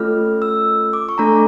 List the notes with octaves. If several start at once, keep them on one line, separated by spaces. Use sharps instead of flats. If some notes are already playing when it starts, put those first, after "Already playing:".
Already playing: A3 C#4 F4 A4 F6
E6
D6
C#6
A3 D4 A4 A#5